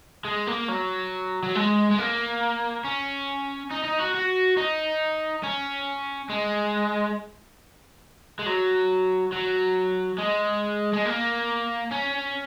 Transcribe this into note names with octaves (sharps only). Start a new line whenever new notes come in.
G#3
A#3
F#3
F#3
G#3
G#3
A#3
C#4
D#4
D#4
F#4
F#4
D#4
C#4
G#3
G#3
F#3
F#3
G#3
G#3
A#3
C#4